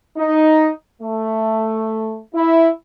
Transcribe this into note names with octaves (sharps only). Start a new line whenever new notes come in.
D#4
A3
E4